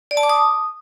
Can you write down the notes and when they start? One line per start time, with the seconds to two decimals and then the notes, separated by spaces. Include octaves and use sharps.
0.11 D5
0.17 A5
0.23 D6
0.29 D#6